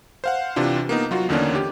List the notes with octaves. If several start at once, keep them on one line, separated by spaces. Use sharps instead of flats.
C5 F5 F#5
C3 E3 D4 F4
A#3 B3 D#4
F#3 F4 F#4
E2 D3 D#3 A#3 C#4 D4
G4